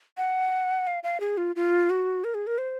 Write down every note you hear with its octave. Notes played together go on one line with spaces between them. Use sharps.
F#5
F5
F5
G#4
F4
F4
F#4
A#4
G#4
A#4
C5